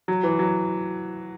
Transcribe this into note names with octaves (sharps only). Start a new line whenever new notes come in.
F#3
E3
F#3